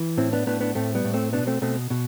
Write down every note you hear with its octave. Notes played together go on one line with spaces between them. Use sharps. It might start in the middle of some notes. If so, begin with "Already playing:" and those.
Already playing: E3
A2 C4 E4
B3 D4
A2 B3 D4
B3 D4
A2 A3 C4
G3 B3
A2
A3 C4
B2 B3 D4
A3 C4
B2 A3 C4
B2